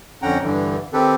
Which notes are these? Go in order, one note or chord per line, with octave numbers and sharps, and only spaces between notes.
F2 D3 C#4 F#5 G5 A#5
G2 D3 E3
D#3 C4 G4 A4 B4